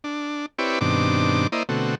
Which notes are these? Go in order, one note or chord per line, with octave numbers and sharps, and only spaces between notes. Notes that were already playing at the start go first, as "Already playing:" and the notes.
D4
C4 E4 G4 B4 C#5 D5
G2 B2 D#3 C4 D4 D6
A#3 E4 C5 D5 D#5
B2 D3 A3 C4 F#4